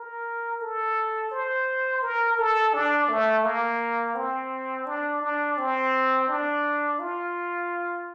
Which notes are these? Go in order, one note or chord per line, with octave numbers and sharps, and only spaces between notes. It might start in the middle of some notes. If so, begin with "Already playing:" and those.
Already playing: A#4
A4
C5
A#4
A4
D4
A3
A#3
C4
D4
D4
C4
D4
F4